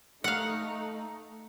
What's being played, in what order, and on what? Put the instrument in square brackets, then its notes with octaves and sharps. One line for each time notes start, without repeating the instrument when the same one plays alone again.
[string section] A3 D#4 [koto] F5 F#5